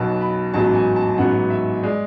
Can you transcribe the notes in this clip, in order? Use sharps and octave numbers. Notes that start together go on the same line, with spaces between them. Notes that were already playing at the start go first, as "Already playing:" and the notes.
Already playing: B1 B2 F#3 B3 A5
B5
A1 G#2 F#3 B3 A5
G#5
A5
A1 G#2 F#3 B3 F#5
E5
G#3 D5